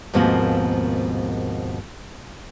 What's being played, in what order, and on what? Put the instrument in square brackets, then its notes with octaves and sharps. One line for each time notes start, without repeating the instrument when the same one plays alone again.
[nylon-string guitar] D#2 G#2 B2 F3 A#3 C4